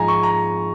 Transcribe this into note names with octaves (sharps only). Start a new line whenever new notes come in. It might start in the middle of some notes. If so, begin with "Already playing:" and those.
Already playing: G#2 F3 G#3 G#5 A#5
C#6
A#5